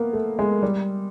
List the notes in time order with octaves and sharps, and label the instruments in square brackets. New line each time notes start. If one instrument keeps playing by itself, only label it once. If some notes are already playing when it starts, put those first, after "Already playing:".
Already playing: [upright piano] A#3 B3
A3
G#3
G3